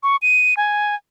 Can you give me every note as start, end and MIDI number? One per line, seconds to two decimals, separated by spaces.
0.03 0.16 85
0.22 0.54 99
0.57 0.95 80